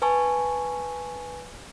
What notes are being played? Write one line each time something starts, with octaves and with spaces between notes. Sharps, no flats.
B4 G#5 A5 C#6